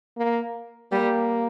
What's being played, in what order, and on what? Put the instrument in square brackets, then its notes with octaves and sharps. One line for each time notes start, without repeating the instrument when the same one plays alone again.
[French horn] A#3
[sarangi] G3 [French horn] A#3